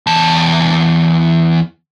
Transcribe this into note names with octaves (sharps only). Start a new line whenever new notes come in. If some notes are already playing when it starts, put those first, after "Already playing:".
E2 A5